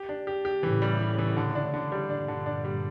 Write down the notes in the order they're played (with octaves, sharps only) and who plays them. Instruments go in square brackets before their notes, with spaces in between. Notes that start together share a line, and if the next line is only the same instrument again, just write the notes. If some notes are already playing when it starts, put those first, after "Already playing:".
Already playing: [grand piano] G4
D4
G4
G4
[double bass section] A2 C#3 [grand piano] E3
[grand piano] G3
E3
E3
D3
D4
D3
G3
[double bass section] G2 A#2 [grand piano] D4
[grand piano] D3
D4
G3